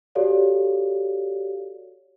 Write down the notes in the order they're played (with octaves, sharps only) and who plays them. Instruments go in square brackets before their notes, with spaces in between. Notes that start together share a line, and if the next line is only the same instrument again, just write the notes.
[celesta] F#4 G4 A4 C#5 D5 F5